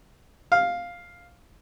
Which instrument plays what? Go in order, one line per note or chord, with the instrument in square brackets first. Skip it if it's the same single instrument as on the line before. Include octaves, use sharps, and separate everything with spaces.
[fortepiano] F5